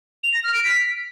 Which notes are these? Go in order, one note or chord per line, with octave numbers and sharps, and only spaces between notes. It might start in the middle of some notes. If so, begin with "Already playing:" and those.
F7
A#6
F6
D7
B6